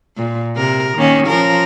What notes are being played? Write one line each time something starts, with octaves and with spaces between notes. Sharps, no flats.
A#2
C3 A#4
D#3 A#3 C#4
F3 C#4 A#4